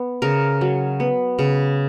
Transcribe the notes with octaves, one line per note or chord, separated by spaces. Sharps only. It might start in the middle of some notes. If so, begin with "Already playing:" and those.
Already playing: B3
C#3 A#4
F#3
B3
C#3